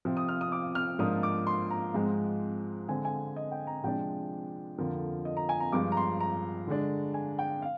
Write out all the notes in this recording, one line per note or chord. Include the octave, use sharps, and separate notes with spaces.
C3 F3 C4
D#6
F6
D#6
D6
F6
G#2 F3 A#3 D4 D#6
D6
C6
A#5
G#2 F3 G#3 C4
D3 G#3 C4 G#5
G#5
D#5
G5
A#5
C3 F3 G#3 D4 G5
F2 D3 F3 A#3
D#5
A#5
G#5
A#5
G2 F3 G#3 D6
A#5
C6
A#5
D3 G#3 D4
G#5
G5
F5